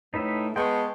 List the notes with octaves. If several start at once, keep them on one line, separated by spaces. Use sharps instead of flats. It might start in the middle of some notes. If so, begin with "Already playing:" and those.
A2 A3 D#4 B4 E5
G#3 B3 G5 A5 C6 C#6